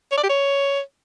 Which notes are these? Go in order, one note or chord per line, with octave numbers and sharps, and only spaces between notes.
C#5
D5
G4
C#5